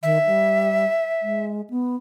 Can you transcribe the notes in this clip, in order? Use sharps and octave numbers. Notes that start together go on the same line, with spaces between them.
D#3 E5
G3
G#3
B3